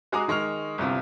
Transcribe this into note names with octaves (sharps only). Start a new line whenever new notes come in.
G#3 F#4 G#4 A#5 D6 D#6
D#3 G#3 C#6 F6 F7
G1 C2 C3 F4